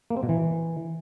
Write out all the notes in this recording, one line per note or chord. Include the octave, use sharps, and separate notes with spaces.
A#3
C4
B2
E3